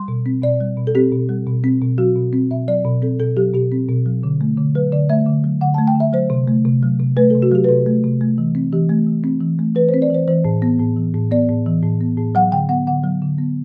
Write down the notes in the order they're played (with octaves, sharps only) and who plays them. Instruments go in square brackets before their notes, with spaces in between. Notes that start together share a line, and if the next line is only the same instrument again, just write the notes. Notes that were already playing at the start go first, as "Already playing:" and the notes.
Already playing: [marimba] G3 C6
B2
C4
B2 D5
G3
B2
A4
C4 G4
B2
G3
B2
C4
B2
F#3 F#4
B2
C4
B2 E5
F#3 D5
B2
C4 A4
B2 A4
F#3 G4
B2 G4
C4
B2
F#3
D3
A3
D3
F#3 B4
D3 D5
A3 E5
D3
F#3
D3 F#5
A5
A3
G5
D3
E5
F#3 C5
C3
A3
C3
F#3
C3
A3 B4
A4
C3
F#4
F#3 G4
B4
C3 A4
A3
C3
A3
E3
C4
E3 G4
A3
E3
C4
E3
A3
E3 B4
C5
C4
D5
E3 C5
E3 C5
A2
B3
A2
E3
A2
B3 D5
A2
E3
A2
B3
A2
F#3 F#5
D3 G5
B3 F#5
D3 F#5
F#3
D3
B3